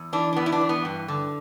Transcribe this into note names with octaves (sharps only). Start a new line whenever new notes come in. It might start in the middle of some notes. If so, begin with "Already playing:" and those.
Already playing: E2
E3 D4
D4
E2 B3
E4
D4
E3
B3
G2
D3